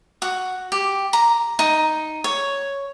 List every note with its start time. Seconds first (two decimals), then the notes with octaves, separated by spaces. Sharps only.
0.22 F#4
0.72 G4
1.13 A#5
1.59 D#4
2.24 C#5